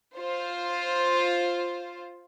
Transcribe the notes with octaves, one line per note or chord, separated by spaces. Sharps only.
F4 C5